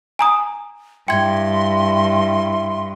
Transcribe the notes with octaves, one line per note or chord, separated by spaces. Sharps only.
G#5 A#5 D#6
G2 E4 G5 C6 G#6